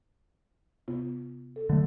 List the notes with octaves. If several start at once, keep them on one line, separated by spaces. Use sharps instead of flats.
C3 B3 F4
A4
D3 F#3 A3